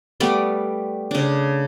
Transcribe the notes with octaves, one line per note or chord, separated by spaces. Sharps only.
G3 A3 B3 D5
C#3 D4